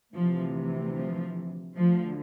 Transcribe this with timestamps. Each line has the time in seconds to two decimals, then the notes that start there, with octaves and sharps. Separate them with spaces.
0.13 D2 C3 E3 F3
0.95 F3
1.76 D2 D3 F3